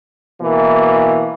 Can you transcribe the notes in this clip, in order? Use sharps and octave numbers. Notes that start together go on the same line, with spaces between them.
B2 E3 A#3